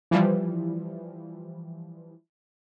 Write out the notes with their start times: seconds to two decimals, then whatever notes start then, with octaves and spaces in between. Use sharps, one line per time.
0.11 E3 F3 G3